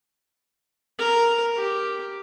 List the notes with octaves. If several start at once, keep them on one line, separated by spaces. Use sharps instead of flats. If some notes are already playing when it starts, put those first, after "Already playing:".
A#4
G4